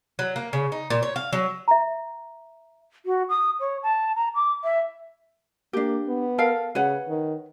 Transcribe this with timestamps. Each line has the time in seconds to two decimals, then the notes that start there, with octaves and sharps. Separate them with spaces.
0.19 F#3
0.36 A#3
0.53 C#3
0.72 D#4
0.90 A#2
1.03 C#5
1.16 F5
1.33 F#3
1.68 E5 A#5
3.06 F#4
3.29 D#6
3.60 C#5
3.83 A5
4.16 A#5
4.35 D6
4.64 E5
5.73 A#3 D4 G4
6.08 B3
6.38 A4 A#4 F5
6.75 C#3 B4 C#5 F#5
7.08 D#3